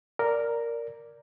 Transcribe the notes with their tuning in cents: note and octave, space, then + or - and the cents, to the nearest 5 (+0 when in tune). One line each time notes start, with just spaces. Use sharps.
A#4 +0 D5 -5